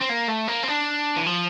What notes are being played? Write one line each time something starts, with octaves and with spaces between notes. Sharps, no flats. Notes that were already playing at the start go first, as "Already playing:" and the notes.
C4
A#3
A3
A#3
C4
D4
E3
F3